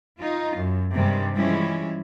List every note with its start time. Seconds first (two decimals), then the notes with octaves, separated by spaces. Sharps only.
0.19 D#4 F4
0.55 F#2
0.93 G2 C3 D#3 G3 G#3
1.36 E3 F3 G3 G#3 C#4 E4